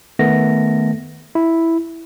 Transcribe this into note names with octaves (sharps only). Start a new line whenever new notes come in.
D#3 A3 B3 A#6
E4